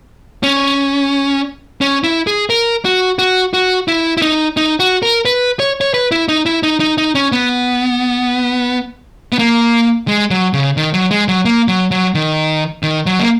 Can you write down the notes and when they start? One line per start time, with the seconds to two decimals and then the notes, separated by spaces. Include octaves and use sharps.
0.43 C#4
1.81 C#4
2.04 E4
2.27 G#4
2.50 A#4
2.85 F#4
3.19 F#4
3.54 F#4
3.88 E4
4.17 E4
4.22 D#4
4.57 D#4
4.80 F#4
5.02 A#4
5.25 B4
5.60 C#5
5.81 C#5
5.94 B4
6.12 E4
6.29 D#4
6.46 E4
6.63 D#4
6.80 D#4
6.98 D#4
7.15 C#4
7.32 B3
9.32 B3
9.39 A#3
10.08 G#3
10.31 F#3
10.53 C#3
10.77 D#3
10.94 F#3
11.11 G#3
11.28 F#3
11.45 A#3
11.68 F#3
11.91 F#3
12.15 D#3
12.83 D#3
13.06 F#3
13.19 A#3